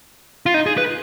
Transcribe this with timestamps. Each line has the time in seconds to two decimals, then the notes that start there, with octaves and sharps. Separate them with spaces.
0.46 F4
0.54 D#4
0.66 G#4
0.77 B4